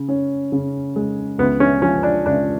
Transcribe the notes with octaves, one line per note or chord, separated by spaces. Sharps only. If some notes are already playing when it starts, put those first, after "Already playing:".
Already playing: C#3
C#4
C#3
G#3
C#2 B3
C#4
F3 C#4
D4
C#2 D4